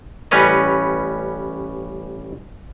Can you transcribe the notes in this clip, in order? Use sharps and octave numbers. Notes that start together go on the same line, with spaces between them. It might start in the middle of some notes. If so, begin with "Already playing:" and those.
A1 G3 C#4 B4 C#5 D#5